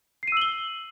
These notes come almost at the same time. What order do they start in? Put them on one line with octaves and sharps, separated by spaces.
C7 D#7 E6 F#7 G7